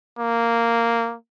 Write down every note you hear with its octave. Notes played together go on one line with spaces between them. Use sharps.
A#3